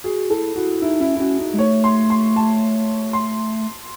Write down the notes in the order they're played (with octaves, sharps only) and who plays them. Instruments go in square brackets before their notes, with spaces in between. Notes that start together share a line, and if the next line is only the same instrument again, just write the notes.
[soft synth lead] F#4 [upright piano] G#4
[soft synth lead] E4 [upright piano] A4
[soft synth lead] E4 [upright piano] F#4
[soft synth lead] D#4 [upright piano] E4
[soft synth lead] C#4 [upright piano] E4
[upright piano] E4
[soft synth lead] C#4 [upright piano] F#4
[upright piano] D#4
[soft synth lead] G#3
[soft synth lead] A3 [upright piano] C#5
[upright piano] C6
C6
A5
C6